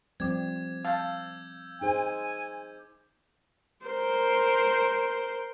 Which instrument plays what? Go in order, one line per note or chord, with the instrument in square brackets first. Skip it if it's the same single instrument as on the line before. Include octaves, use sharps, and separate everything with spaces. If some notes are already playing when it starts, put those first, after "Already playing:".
[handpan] F3 G3 C4 [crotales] D6 G#6
[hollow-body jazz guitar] F5 A5 [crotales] E6 G6
[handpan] D#4 G#4 C5 [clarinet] G#5
[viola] A#4 C5